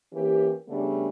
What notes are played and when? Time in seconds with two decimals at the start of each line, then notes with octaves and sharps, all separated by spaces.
0.13 E3 A#3 C#4 G4
0.68 C#3 G3 A3 B3 D4